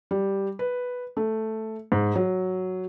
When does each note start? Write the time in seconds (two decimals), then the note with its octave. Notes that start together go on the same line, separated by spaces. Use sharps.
0.11 G3
0.59 B4
1.17 A3
1.92 G#2
2.16 F#3